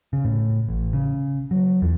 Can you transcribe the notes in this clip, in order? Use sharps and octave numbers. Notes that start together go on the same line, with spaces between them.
C#3
A2
A1
C#3
F#3
E2